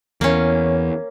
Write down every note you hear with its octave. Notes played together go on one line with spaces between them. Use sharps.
E2 A#3 C#4